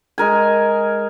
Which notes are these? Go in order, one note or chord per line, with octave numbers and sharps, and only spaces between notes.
G#3 A#4 G#5